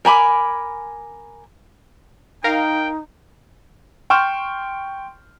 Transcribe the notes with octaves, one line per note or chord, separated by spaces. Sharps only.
A#4 G#5 B5 D6
D#4 A#4 F5 G5
G5 C6 C#6 F6 G6 E7